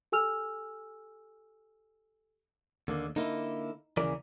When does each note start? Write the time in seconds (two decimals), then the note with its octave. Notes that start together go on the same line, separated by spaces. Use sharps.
0.12 G4 A4 G#5 E6 F6 F7
2.88 D#2 D3 A#3
3.16 D3 A#3 D#4 E4
3.97 D#2 C#3 E3 A#4 D5